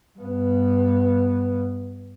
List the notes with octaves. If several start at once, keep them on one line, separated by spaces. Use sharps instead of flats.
G2 B3